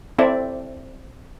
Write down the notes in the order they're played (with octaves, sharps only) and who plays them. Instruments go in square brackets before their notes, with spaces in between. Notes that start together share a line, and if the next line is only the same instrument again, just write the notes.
[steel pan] C4 E4 A4 D5 E5